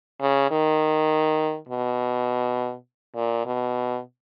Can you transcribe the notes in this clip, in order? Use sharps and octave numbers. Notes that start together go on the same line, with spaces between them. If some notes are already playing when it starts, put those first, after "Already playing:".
C#3
D#3
B2
A#2
B2